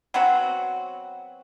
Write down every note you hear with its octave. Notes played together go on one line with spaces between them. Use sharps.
F#3 B3 C4 F#4